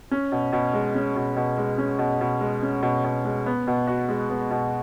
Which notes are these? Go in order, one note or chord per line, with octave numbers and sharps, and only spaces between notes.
C#4
B2
B2
G#3
C#4
B2
B2
G#3
C#4
B2
B2
G#3
C#4
B2
B2
G#3
B3
B2
F#4
G#3
B3
B2